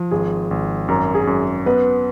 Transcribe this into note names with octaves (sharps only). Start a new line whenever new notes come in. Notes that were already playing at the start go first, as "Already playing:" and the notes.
Already playing: F3
G#1 G#4
G#1
F#2 A#4
G#4
F#2
B3 B4